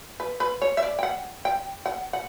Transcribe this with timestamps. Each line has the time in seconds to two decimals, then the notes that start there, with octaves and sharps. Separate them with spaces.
0.20 B4
0.40 B4
0.62 C#5
0.77 E5
0.83 D5
0.99 G5
1.03 F#5
1.45 G5
1.86 F#5
2.13 F#5